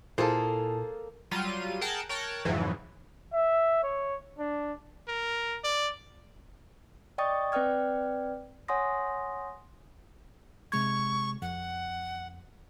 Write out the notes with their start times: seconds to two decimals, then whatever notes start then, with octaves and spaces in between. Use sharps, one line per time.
0.18 A#2 A#3 E4 F4 G#4 A4 C5 A5
1.31 F#3 G3 F4 D#7
1.81 G#4 A#4 F#5 G5 A5
2.09 A#4 C#5 G5 A5 F#6 A6
2.45 F2 G#2 C#3 E3 F#3
3.33 E5
3.83 C#5
4.39 D4
5.08 A#4
5.64 D5
7.18 D5 D#5 G5 C#6 D#6 A6
7.52 C4 B4 D5 G5 F6 G#6
8.68 C#5 F#5 G#5 C6 D#6 A#6
10.72 C3 G#3 C#6 G#6
11.42 F2 F#5